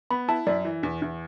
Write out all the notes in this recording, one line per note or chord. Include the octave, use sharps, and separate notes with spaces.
B3 B5
E4 A5
F#2 D5
E3
E2
E2